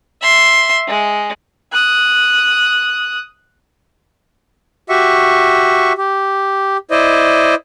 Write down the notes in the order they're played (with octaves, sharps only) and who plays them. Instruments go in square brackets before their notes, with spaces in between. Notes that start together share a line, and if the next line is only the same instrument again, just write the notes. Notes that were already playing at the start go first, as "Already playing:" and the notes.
[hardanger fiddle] E5 C6
G#3
[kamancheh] D#6 F#6
[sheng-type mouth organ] F#4 G4 E5 C#6
G4
E4 C5 D5 D#5